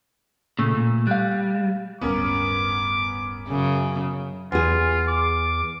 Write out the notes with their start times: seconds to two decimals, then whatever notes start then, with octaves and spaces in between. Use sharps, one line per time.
0.59 A#2 C#3 A3
0.75 A#2
1.07 G3 F5 F#6
2.01 D1 G2 B3 C#4 A#4 D6
3.48 F#2 C#3
4.52 E2 F4 G#4
5.08 D6